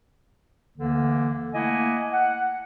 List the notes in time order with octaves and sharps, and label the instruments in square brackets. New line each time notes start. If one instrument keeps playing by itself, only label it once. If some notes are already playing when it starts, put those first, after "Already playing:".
[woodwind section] D2 D3 E3 A#3
A3 A#3 E4 D#5 F#5 G#5
F#5